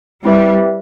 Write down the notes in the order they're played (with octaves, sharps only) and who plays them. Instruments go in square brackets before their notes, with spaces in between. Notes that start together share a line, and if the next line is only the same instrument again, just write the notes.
[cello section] G3 [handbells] C4 E4 G4 B4 E5